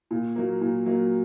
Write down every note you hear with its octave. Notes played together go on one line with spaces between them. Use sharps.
A#2
F#3 A#3
A#2
F#3 A#3